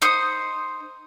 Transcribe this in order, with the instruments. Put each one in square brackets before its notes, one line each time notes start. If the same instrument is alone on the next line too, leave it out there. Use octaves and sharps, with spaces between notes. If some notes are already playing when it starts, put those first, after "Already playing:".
[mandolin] D#4 C5 D#6